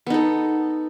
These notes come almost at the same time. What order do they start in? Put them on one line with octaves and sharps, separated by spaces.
B3 D#4 A4